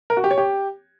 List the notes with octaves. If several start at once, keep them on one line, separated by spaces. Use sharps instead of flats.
A#4
F#4
G4
C#5
G4